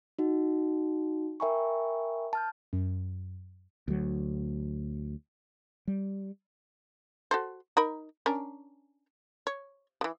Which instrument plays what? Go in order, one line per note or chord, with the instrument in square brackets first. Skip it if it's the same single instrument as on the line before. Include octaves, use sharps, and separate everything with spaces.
[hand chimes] D#4 F#4
A#4 E5 G5 G#5 B5 C#6
A5 F6 G6
[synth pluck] F#2
[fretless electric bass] D2 F#3
G3
[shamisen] F#4 A4 C5
D#4 A#4 B5
C#4 D4 A#4
C#5
C#3 E3